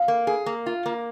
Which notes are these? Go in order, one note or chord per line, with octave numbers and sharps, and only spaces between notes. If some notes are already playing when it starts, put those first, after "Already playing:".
Already playing: F5
A#3
G#4
A#3
F4
A#3